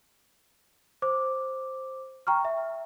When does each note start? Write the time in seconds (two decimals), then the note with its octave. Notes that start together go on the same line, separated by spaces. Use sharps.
1.02 C5 D6
2.27 G5 A#5 C#6 F6
2.45 E5